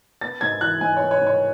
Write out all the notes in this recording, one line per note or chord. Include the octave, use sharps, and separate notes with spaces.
B3 A6
G#2 G#6
E3 F#6
G#2 G#5
B3 C#5
C#5
G#2
C#5